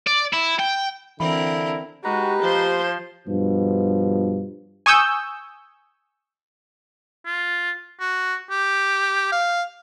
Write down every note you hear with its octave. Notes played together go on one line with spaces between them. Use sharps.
D5
E4
G5
D3 E3 C4 E4 A#4 B5
G#3 D#4 F#4 G4 B4 A#5
F3 C5 C6
G2 B2 F3
G#5 C#6 D#6 E6 G6
F4
F#4
G4
F5